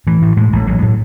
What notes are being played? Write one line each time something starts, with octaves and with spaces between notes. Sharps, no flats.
A2 E3
A2
A2 G#3
A1
A1 F#3
A2